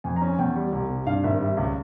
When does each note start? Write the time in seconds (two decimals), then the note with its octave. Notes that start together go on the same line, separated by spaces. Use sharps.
0.04 F2 G#5
0.16 A#5
0.22 C#4
0.28 G#5
0.38 E2 G5
0.56 G3
0.72 C2
0.90 C3
1.06 G2 F5
1.24 G#1 E5
1.40 G3 E5
1.57 C#2